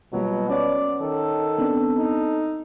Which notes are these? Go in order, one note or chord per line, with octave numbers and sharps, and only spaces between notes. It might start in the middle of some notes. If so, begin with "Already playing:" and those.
B2 F#3 G3 A#3 F4
C#4 C#5 D5 F#5
D#3 A4
B3 C4 D4
D#4